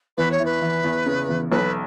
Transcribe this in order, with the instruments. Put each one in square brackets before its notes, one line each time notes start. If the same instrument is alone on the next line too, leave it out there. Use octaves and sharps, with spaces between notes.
[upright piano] E2 [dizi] B4
[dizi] C#5
[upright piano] E3
[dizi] B4
[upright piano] E3
E2
C#3
E2
[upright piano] B1 [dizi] B4